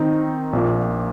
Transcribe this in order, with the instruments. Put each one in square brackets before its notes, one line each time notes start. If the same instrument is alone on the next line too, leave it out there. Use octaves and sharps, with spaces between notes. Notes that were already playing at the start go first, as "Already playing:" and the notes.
Already playing: [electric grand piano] D#3 C4 D#4 A#4
A#1 A#2 A#3